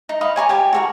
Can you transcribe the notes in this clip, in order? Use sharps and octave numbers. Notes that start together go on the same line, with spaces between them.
D#4
D#5 F5 B5
C#5 G#5 A#5 D6
G4 G#5 A5
F#4 A4 A#4